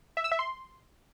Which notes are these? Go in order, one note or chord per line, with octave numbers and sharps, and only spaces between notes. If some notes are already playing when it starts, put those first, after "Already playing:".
E5
E6
E5
C6